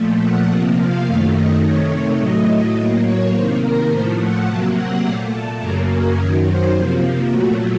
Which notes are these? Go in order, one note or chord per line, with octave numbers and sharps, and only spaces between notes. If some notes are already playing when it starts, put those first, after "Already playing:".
Already playing: A#2 F3 A3
F#5
C3 F3 A#3
F5
F#2 D#3 A3 F5
D#5
C3 D#3 A3 C#5
A2 F#3 A3 D#5
A2 F#3 A#3 D#5
C#5
C3 D#3 A#3 C5
A#4
A2 F3 A3 C5
F#5
C3 F#3 A#3 A5
F#5
A#2 A3 F5
A5
F#2 C#3 F#3 A#3 A#4
A#4
F#2 D#3 F#3 C#5
C5
C3 F3 A#3
A#2 F#3 A3 F#4